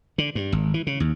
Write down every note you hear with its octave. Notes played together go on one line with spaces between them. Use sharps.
D3
G2
G#1
E3
C#3
D#2